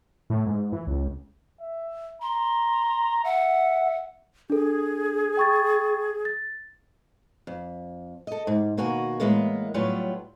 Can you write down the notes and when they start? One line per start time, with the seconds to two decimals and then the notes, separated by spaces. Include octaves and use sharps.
0.30 A2
0.46 G#2
0.73 E3
0.87 C#2
1.61 E5
2.22 A#5 C6
3.24 E5 F#5
4.50 D4 G#4 A4
5.37 G5 C#6 A6
6.25 A6
7.47 F2
8.27 A4 D#5
8.47 G#2
8.77 D#2 B2 A#3 F#4 G#5
9.20 A2 E3 G#3 A#3 B3
9.74 A2 F#3 G3 B3 F4